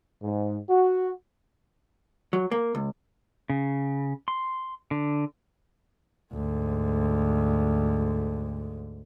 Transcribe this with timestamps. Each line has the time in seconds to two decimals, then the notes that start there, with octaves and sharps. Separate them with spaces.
0.23 G#2
0.69 F#4
2.33 F#3
2.51 A#3
2.75 C#2
3.50 C#3
4.28 C6
4.91 D3
6.33 D2 G#2